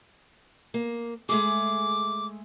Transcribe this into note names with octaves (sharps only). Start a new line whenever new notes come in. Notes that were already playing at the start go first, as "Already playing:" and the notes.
A#3
G#3 A3 G#4 D6